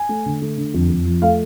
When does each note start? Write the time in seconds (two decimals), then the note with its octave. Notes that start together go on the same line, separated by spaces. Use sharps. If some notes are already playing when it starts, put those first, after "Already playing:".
Already playing: G#5
0.09 A3
0.26 D3
0.42 A3
0.58 D3
0.74 F2
0.90 F2
1.05 F3
1.22 A3 F5